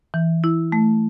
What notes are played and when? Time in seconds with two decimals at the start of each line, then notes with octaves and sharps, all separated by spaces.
0.14 E3
0.44 E4
0.72 A3